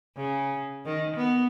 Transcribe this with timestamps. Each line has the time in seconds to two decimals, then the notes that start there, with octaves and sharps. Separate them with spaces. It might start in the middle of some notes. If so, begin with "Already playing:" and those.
0.17 C#3
0.85 D#3
1.17 B3